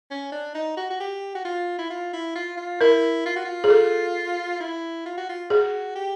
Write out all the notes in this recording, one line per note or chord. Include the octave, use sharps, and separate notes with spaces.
C#4
D4
D#4
F#4
F#4
G4
F#4
F4
E4
F4
E4
F4
F4
E4 A#4
F4
F#4
F4
G#4
A4
E4
F4
F#4
F4
F#4 G#4
G4